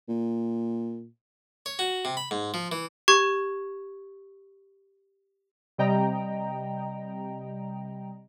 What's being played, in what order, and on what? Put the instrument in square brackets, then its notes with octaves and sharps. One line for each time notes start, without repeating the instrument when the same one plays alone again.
[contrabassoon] A#2
[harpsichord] C#5
F#4
C3
B5
G#2
F3
E3
[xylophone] G4 C#6 G#6
[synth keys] C3 G3 D#5 G5 A#5